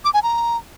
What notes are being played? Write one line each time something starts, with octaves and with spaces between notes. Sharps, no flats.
D6
G#5
A#5